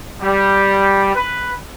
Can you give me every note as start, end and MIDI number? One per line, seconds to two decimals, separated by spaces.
0.20 1.14 55
1.15 1.51 71